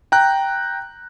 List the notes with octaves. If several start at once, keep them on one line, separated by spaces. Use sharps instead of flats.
G5 A#5 F#6